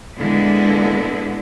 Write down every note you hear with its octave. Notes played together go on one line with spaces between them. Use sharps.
A#2 D3 G#3 B3 E4